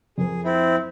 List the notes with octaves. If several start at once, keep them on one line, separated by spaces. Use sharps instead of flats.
F2 G#4 A#4
C4 E4